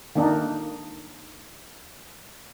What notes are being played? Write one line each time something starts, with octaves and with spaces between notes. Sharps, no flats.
D#3 A#3 D4 D#4